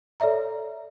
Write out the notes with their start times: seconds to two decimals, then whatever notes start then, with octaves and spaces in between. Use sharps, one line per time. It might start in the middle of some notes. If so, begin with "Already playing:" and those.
0.20 A4 C#5 D5 E5 A#5